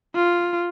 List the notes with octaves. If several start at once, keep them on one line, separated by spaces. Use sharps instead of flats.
F4